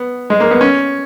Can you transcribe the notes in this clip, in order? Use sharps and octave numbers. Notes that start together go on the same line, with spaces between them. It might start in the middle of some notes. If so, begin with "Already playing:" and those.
Already playing: B3
G#3
A#3
B3
C#4